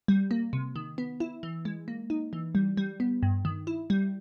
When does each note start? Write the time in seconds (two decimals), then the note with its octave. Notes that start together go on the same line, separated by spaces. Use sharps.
0.08 G3
0.31 A#3
0.53 C3
0.76 D#3
0.98 B3
1.20 E4
1.43 E3
1.65 G#3
1.88 A#3
2.10 D#4
2.33 E3
2.55 G3
2.77 G3
3.00 B3
3.23 G2
3.45 D#3
3.67 E4
3.90 G3